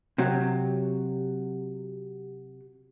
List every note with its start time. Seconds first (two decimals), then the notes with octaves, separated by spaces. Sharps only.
0.18 C3 F#3